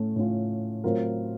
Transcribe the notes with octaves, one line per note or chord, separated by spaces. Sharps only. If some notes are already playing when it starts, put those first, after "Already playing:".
Already playing: A2 A3 C#4
A2 A3 C#4 F4
A2 F#3 C4 F4 A#4